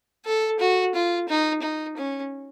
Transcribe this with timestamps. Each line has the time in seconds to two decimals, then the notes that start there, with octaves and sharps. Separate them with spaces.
0.26 A4
0.60 F#4
0.94 F4
1.28 D#4
1.62 D#4
1.97 C#4